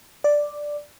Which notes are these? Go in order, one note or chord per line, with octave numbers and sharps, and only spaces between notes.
D5